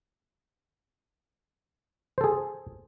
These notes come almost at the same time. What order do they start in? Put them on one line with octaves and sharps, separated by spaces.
C5 A4 G#4